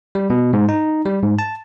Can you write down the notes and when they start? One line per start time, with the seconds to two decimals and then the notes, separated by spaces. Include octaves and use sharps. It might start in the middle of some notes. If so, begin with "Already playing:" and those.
0.15 G3
0.30 B2
0.53 G#2
0.69 D#4
1.06 G3
1.23 G#2
1.39 A5